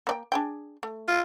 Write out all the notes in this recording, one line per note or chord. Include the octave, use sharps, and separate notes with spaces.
A#3 D5 G5
D4 G#4 G5
A3
F4